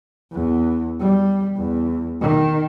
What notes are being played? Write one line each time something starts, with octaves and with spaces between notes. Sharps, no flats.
E2
G3
E2
D#3